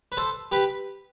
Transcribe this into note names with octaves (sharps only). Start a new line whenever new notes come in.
B4
A4 C5
G4 B4